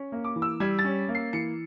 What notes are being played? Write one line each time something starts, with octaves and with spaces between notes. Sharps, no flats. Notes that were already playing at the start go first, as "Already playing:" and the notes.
Already playing: C#4
A#3
D6
E3
E6
G3 G#6
A6
C#4
A#3
C7
E3 C#7